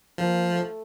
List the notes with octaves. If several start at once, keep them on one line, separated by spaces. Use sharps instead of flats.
F3 A#3
A3